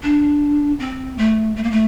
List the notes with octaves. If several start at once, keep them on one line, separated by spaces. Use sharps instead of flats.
D4
C4
A3
A3
A#3
A3